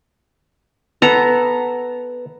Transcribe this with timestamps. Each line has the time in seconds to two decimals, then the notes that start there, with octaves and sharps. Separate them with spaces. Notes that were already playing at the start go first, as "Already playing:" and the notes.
1.02 B3 A4 A#5